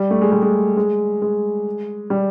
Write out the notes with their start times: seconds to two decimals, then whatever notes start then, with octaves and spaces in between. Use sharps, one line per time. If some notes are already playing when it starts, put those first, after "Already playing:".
Already playing: G3
0.11 A3
0.22 G#3
0.32 G3
0.42 G#3
0.77 G#3
1.22 G#3
2.10 G3